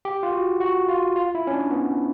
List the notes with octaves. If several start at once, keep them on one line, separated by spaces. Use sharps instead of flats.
G4
F4
F#4
F#4
F4
F4
E4
C#4
D4
B3